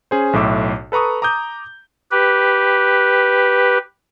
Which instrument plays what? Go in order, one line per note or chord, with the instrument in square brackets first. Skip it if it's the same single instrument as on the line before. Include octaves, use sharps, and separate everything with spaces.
[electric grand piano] C#4 G#4 C5
B1 A2 E5 D6 E6
A4 B4 A#5 C#6 D#6
A#5 D6 D#6 G6
[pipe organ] G4 B4